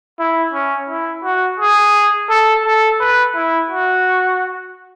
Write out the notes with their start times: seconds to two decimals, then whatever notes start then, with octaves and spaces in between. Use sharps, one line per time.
0.19 E4
0.53 C#4
0.89 E4
1.24 F#4
1.60 G#4
2.30 A4
2.65 A4
3.00 B4
3.35 E4
3.71 F#4